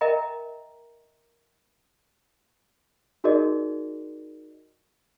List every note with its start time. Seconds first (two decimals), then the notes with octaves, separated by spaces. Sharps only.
0.01 A#4 D#5 E5 G5 A#5
3.24 D#4 F#4 G#4 A#4 D5 D#5